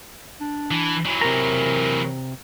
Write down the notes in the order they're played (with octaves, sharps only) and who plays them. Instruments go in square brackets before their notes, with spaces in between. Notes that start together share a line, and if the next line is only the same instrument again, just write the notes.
[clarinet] D4
[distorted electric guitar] E3
E3 F#3
[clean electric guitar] C3 A#5 [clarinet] A#4